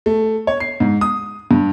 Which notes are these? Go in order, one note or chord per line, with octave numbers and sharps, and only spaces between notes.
A3
C#5
C7
G#2
D#6
G2